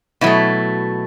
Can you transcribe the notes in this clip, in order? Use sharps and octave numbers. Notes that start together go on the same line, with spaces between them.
B2 F#3 A3 E4